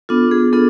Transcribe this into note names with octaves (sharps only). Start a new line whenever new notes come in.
B3 D4 F4 A4
G#4
B3 D4 F4 A4